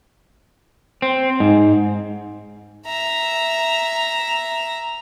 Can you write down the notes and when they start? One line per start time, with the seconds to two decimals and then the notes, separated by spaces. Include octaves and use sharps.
1.02 C4
1.40 G#2
2.86 E5 A#5